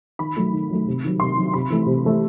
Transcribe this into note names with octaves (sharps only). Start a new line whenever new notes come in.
D#3 B5
F#3 A3
D#3
F#3 A3
C3
D#3 F#3
C3 C6
D#3 F#3
C3 B5
E3 A3
C3
E3 A3